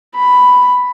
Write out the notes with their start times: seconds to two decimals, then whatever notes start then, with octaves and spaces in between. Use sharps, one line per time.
0.15 B5